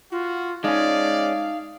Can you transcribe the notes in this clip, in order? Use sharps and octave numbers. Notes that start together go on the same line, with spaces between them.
F4 F#4
G#3 C#4 D#4 D5 F5 D#6